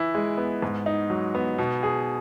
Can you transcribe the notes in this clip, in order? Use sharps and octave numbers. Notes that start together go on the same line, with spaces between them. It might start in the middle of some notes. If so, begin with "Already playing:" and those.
Already playing: E3 E4
G#3
B3
G#2
D#4
F#3
B3
B2
G#4